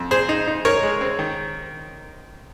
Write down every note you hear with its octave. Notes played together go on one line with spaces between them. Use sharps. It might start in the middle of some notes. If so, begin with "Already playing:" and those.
Already playing: F2
A#2 G#4 C5
D#4
D#4
D#4 A#4 C#5
G#3
C4
D#3